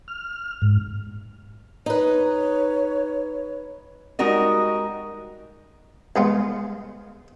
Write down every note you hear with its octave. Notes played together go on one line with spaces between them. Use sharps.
F6
G#2
D#4 B4 C#5
G3 G#3 D#4 F#4 A#4 D#5
C2 G#3 B3 F4